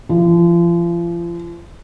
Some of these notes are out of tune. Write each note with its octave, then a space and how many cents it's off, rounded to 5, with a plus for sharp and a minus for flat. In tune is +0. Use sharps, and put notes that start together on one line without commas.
F3 -35